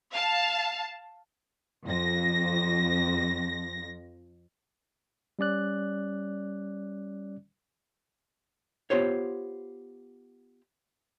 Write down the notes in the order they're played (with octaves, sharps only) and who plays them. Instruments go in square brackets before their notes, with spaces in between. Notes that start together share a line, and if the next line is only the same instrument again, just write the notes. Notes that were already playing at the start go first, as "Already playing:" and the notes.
[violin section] F5 A5
[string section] F2 A#6
[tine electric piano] G3 C#4 D5 F#6
[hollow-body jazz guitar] B3 F4 G4 C5 C#5